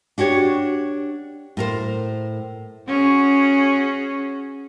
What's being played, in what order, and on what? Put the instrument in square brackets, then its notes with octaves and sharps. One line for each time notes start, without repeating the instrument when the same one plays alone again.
[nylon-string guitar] D4 F#4 G4 C#5
A2 A#4 C5
[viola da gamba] C#4 F#4 G#4